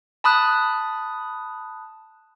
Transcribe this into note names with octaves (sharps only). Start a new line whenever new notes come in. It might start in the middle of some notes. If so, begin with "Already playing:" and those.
A5 B5 D#6 F#6